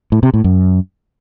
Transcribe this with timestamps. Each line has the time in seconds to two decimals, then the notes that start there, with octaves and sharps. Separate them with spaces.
0.12 A2
0.23 C3
0.34 A2
0.44 F#2